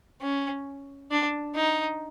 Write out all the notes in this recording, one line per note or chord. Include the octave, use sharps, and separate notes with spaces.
C#4
D4
D#4